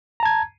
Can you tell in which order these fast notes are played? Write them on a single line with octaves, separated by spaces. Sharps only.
A#5 A5 G#6